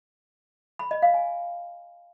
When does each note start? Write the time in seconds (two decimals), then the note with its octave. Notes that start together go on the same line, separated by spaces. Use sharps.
0.79 B5
0.91 D#5
1.02 F5
1.14 G#5